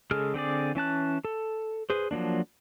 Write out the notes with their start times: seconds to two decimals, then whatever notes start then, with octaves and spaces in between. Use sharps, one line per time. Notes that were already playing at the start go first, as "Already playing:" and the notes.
0.11 C#3 G#3 G#4 A4 F6
0.34 D3 C4 G#4 D5
0.75 E3 C#4 A5 F#6
1.25 A4
1.90 G#4 B4 C5
2.11 F3 F#3 A#3 D4